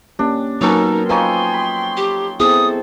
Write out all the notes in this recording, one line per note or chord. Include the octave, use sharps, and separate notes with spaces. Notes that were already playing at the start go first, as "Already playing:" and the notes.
A#3 C#4 D4 G4
F#3 A#3 B3 C#4 D#4 A4 A#4
F3 D#4 B4 C#5 G5 G#5 C6
B5
G4
B3 C4 E4 G#4 A4 D#6